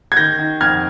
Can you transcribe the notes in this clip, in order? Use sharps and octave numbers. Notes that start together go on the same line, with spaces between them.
G#6
D#3 G6 A#6
D#3
F2 F6 G#6